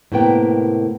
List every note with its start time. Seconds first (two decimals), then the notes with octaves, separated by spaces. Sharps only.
0.12 A2 C3 A#3 B3 G5